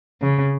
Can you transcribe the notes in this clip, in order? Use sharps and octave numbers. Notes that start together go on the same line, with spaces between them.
C#3